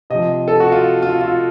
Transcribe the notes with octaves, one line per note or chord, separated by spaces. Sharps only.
C3 F3 D#5
A4
F#4
F4
F4
F4